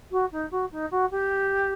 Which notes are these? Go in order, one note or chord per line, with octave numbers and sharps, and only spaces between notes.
F#4
D#4
F#4
D#4
F#4
G4